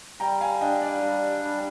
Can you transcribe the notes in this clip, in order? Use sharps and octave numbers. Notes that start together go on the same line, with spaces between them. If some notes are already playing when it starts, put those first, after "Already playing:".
G3 G5 A#5
F5 G#5
D4 D#5 G5
D5 F5
G3
G3